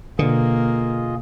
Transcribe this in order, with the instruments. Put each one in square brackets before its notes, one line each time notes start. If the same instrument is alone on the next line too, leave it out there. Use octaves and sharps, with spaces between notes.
[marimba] B2 [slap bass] D3 [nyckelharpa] A#3 [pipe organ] F4 G#4 D#5